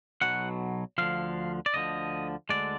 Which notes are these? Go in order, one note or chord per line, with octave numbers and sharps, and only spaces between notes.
B1 B2 F#3 F#5
D2 D3 F3 F5
D5
D2 D3 F3 D#5
D2 D3 G#3 D5